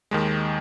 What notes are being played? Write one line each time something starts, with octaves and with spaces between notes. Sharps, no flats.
D#2 D#3 G#3